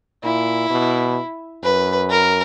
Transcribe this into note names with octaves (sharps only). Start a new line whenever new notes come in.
A#2 E4
B2
F#2 B4
A#4